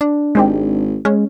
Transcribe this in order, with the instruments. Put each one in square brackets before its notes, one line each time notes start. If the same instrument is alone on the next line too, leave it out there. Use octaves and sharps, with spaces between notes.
[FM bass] D4
[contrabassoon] G#1 [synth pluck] G#3 C4 G4
[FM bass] G#3 [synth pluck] C#4